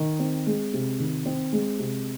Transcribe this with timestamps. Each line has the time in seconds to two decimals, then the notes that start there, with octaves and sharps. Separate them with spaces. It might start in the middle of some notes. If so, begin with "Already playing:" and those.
Already playing: D#3
0.20 C4
0.47 G#3
0.73 C3
1.00 D#3
1.26 C4
1.53 G#3
1.79 C3